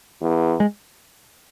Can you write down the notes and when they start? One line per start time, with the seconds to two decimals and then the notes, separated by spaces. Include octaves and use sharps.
0.21 E2
0.60 G#3